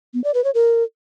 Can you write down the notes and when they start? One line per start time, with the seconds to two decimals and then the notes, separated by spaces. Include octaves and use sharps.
0.14 B3
0.24 D5
0.34 B4
0.44 C#5
0.54 A#4